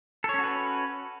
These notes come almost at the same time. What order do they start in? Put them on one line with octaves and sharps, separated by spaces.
A4 C#5 C#4 F#4 B4